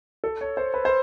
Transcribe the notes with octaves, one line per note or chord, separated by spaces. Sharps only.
A4
C#5
C5
B4
C5